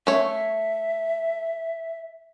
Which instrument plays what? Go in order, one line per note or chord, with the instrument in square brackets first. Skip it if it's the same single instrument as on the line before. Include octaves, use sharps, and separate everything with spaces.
[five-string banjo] A3 C#5 [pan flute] E5